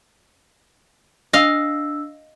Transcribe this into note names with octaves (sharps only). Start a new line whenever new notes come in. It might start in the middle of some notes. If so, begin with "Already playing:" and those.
D4 D#5 F5 E6